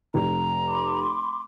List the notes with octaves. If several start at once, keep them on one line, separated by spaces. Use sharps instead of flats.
F1 A#5
B5 C6 D6